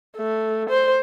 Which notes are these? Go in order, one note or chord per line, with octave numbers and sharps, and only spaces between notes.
A3
C5